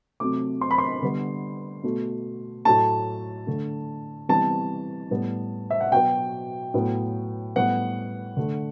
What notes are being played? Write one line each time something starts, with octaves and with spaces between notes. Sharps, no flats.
C3 F#3 A3 D6
C6
B5
C6
D3 G3 B3
B2 A3
A2 F#3 A3 A5
D3 A3
C3 E3 G3 B3 A5
A2 G3 B3
E5
F#5
B2 F#3 B3 G5
A2 F#3 B3
A2 G3 B3 F#5
D3 A3